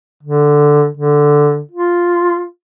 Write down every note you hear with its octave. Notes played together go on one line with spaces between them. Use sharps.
D3
D3
F4